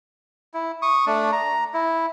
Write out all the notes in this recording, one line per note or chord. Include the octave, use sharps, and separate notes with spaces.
E4
C#6 D#6
A3 D4
A#5
E4